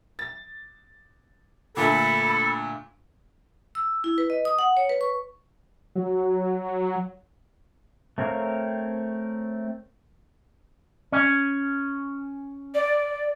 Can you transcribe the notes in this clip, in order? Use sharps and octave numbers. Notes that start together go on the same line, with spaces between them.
A6
A#2 D3 A3 A4 B5
E6
E4
B4
D#5
D#6
F#5
C#5
B4
C#6
F#3
A3 C4 A#4 C#5 F5
C#4
D5